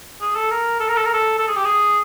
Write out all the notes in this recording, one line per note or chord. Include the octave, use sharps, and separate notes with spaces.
G#4
A4
A#4
A4
A#4
A4
A#4
A4
A4
G#4
G4
G#4